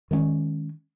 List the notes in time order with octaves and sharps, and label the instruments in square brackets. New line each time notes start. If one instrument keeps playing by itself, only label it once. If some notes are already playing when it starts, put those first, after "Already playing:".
[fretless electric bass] D#3 G#3 A#3 C#4